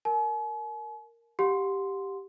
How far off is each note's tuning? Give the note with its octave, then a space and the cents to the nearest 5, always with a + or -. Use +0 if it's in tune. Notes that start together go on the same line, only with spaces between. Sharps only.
A#4 -5 G#5 +45
G4 +0 F#5 -35 C6 -5